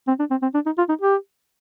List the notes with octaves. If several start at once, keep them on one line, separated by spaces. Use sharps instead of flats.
C4
D4
C4
C4
D4
D#4
F4
D#4
G4